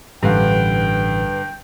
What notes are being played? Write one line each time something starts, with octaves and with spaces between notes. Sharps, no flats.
A1 G2 D3 B4 F5 G5